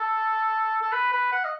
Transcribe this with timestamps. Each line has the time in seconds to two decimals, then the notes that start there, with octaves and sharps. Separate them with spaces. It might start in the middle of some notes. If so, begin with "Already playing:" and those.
Already playing: A4
0.81 A4
0.92 B4
1.12 B4
1.32 F#5
1.44 D#5